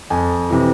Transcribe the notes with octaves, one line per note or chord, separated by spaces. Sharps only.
F2 G#5
C3 E3